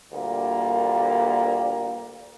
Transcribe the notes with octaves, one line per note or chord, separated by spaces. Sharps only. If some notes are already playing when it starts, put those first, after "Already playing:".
D2 A#2 G3 A#3